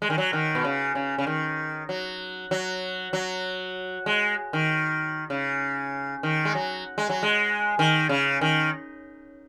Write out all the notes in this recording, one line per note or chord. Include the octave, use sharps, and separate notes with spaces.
G#3
D#3
F#3
D#3
B2
C#3
C#3
C#3
D#3
F#3
F#3
F#3
G#3
D#3
C#3
D#3
G#3
F#3
G#3
F#3
G#3
D#3
C#3
D#3